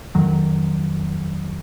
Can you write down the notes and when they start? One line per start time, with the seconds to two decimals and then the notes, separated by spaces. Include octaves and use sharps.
0.15 F2 D#3 F#3